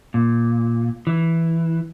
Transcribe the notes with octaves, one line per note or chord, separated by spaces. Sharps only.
A#2
E3